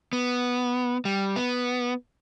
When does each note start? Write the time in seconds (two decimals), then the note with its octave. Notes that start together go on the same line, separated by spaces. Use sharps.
0.13 B3
1.05 G3
1.36 B3